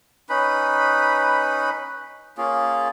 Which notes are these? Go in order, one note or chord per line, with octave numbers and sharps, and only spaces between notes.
C#4 D#4 B4 B5
A#3 C#4 F4 G#4